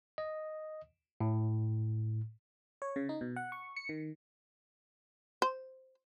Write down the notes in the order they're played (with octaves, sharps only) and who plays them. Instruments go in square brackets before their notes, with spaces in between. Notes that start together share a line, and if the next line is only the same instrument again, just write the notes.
[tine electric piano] D#5
A2
[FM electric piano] C#5
C#3
D#4
B2
F#5
C#6
C#7
D#3
[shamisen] C5